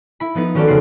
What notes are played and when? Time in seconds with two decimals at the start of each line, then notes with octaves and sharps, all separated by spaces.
0.20 E4 B5
0.35 F3 B3 D#4 B4
0.54 D#3 C#4 F#4 A4 D5
0.67 F1 C#3 G#4 F#5 C6 D7